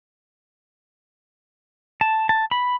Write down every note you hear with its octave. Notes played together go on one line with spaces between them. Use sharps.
A5
A5
B5